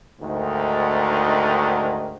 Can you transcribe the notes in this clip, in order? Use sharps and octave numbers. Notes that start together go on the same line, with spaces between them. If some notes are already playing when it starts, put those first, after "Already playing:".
D2 G#2 D#3